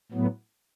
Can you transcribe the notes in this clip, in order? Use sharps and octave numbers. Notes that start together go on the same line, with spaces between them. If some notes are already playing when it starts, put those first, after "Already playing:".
A2 F#3 B3